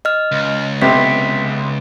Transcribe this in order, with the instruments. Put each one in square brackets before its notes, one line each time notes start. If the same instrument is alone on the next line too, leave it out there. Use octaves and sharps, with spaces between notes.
[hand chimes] D#5 F6
[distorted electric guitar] C#2
[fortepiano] B1 C3 [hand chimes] B6